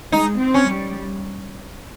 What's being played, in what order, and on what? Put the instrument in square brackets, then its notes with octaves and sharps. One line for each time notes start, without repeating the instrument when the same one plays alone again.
[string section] G#3 [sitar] D#4
[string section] C4
[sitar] C#4
[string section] G3